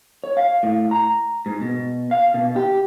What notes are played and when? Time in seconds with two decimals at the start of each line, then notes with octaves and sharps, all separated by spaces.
0.24 C#5
0.37 F5
0.63 A2
0.91 A#5
1.46 G#2
1.61 B2
2.11 F5
2.34 B2
2.56 G4